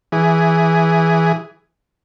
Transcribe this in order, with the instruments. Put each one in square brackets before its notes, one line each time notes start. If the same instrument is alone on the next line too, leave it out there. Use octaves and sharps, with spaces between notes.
[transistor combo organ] E3 G#4